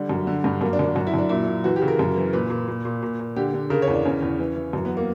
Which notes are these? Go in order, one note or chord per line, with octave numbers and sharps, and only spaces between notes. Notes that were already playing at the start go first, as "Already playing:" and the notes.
Already playing: D3 G3
F#2
D3
G2
F#2 A#3
D4
F#2
D4
F#2 F#4
E4
F#2 D4
A#2 E4
A#2
E3 F#4
G4
C#3
A#4
F#2
E3
A#2 B4
A#2
A#2
A#2
A#2
A#2
D3 G4
D3
C#3 A#4
C#5
E2
D4
E2 C#4
E2
E3
E3
F#2
B3
A#3